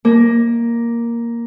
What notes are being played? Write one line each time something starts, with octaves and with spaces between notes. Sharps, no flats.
A#3